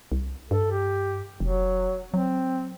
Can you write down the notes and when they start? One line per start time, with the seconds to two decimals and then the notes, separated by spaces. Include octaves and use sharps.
0.12 C2
0.51 G2 A4
0.71 G4
1.40 F1 F#3
2.14 F#3 C4